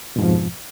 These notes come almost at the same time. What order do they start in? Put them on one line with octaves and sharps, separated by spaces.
B2 G#2 F2 F3